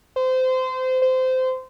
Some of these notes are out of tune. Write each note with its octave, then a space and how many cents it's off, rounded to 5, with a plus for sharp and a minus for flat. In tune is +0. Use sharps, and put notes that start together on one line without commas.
C5 -25
C5 -20